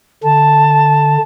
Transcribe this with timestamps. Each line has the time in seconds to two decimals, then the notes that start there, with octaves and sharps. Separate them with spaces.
0.24 D3 A5